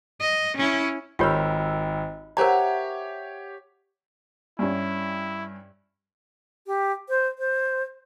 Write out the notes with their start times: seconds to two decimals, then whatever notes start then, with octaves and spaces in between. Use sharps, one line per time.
0.20 D#5
0.57 C#4 E4
1.19 G#1 F4 G4 A#4 C#5 B5 E6 F6
2.37 G4 A#4 C5 C#5 E5 F#5 G#5 A#5
4.59 G2 C#4 E4
6.66 G4
7.09 C5
7.38 C5